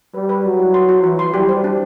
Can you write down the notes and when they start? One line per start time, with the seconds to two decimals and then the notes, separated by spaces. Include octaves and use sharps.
0.14 G3 B4
0.29 B4
0.44 F#3 B4
0.59 E4
0.74 C6
0.89 F#4
1.04 E3 F#4
1.19 C6
1.34 G3 G4
1.49 C5
1.64 D4